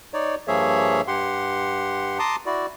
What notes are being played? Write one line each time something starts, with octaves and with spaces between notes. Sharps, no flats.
D#4 C#5 D5
G2 F3 A#3 G#4 C#5 E5
G2 G4 F#5 C6
A5 A#5 C6 D6 D#6
E4 F#4 D5